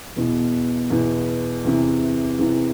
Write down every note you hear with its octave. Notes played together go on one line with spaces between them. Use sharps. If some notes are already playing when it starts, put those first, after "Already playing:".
E2 B2 B3
E2 B2 B3
E2 C3 E3
E2 C3 E3